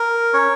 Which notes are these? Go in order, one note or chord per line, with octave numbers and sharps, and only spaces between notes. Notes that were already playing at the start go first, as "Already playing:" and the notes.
Already playing: A#4
C#4 C#5